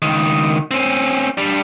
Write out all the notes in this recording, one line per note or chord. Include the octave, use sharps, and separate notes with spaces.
C#2 D#3
C4 C#4
G3 D4